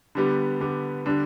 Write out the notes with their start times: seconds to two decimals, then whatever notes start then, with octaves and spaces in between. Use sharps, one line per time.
0.15 D3 G3 B3 G4
0.60 D3 G3 B3 G4
1.06 D3 G3 D4